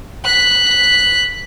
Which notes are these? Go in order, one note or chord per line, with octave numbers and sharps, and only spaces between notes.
F#6 B6